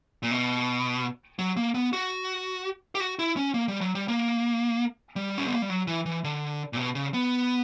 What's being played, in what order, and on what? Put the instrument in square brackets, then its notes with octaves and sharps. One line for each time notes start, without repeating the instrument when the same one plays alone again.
[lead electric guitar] A#2
B2
F#3
A#3
B3
F#4
G4
F#4
E4
C#4
A#3
G3
F#3
G3
A#3
G3
C#4
B3
A#3
G3
F#3
E3
E3
D3
A#2
B2
C#3
B3